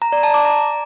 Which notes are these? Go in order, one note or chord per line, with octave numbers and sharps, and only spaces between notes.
A#5
D5
A5
D6
A#5